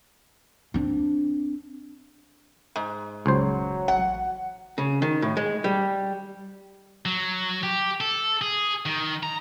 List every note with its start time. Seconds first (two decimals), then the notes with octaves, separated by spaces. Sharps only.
0.74 C4 D4
2.76 G#2
3.26 D#1 C#2 F#3 C5
3.88 A1 F#5
4.78 C#3
5.02 D#3
5.22 A2
5.37 G#3
5.64 G3
7.05 F#3
7.63 G4
8.01 A4
8.41 G#4
8.86 D#3
9.23 A#5